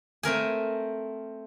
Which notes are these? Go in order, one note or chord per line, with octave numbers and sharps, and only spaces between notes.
A3 C4 A#4 G#5